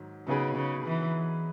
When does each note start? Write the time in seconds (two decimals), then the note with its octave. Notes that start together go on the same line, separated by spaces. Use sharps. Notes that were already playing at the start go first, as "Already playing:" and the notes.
Already playing: G#2 D#3 F#3
0.27 C#3 F#3 B3 D#4 G#4 B4
0.56 C#3
0.86 E3